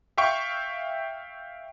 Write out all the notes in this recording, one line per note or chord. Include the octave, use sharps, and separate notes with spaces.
E5 F5 G5 C#6